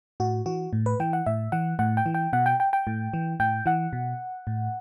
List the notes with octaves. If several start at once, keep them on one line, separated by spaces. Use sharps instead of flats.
A2 F#4
E3 F#4
A2
B4
E3 G5
F#5
A2 E5
E3 F#5
A2 F#5
G5
E3
G5
B2 F#5
G5
G5
G5
A2
E3
A2 G5
E3 F#5
B2
A2